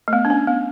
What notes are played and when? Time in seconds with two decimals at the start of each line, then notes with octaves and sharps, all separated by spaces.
0.08 A3
0.13 B3
0.25 D4
0.30 C#4
0.47 B3